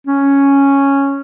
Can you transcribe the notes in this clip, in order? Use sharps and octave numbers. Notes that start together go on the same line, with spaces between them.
C#4